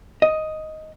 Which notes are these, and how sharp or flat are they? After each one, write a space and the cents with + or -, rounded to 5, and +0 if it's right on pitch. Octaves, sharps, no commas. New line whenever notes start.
D#5 +5